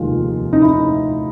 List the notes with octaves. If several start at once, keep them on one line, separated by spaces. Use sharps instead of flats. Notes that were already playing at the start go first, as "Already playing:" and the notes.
Already playing: F1 D#2 D#3 G#3 F4
D#4
E4